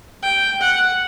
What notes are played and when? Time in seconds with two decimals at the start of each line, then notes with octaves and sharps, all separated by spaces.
0.23 G5
0.61 F#5